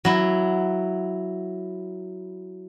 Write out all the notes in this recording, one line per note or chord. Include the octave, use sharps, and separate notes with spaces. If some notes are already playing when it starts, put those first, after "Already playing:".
F#3 E4